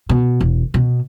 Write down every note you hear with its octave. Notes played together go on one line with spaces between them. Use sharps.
B2
E1
B2